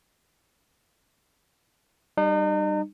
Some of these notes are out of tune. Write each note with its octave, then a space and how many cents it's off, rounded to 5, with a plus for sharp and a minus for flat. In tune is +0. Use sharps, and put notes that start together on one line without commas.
G3 +0 D#4 -40